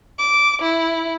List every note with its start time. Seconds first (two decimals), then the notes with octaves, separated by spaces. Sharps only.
0.18 D6
0.62 E4